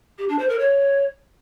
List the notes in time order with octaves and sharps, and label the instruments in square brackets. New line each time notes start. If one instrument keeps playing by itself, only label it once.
[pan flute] G4
D4
C5
A#4
C#5